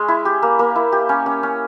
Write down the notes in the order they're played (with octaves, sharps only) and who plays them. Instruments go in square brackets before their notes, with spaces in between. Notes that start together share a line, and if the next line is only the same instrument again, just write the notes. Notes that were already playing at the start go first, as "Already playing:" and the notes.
Already playing: [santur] G#3 C#4
E4
G4
A#3
A#3
E4
G4
C#4
C#4
C#4